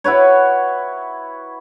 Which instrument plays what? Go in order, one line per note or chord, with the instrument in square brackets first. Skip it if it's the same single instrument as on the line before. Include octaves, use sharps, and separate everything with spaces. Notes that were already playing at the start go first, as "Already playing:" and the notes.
[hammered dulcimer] E4 F#4 B4 C#5